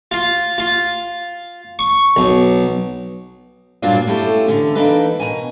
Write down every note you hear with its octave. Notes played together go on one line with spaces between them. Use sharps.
F4
F4
C#6
B1
G2 A#2 F#3 A#3 D4 F4
A3 C#4 E4 F4 G4 A4
E2 D3 C#4
E3 A#3 D4 D#4 A4 B4
B2 A#4 G#5